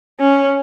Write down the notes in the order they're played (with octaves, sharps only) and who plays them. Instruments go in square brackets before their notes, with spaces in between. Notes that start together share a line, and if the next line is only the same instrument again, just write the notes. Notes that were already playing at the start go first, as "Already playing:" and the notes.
[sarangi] C#4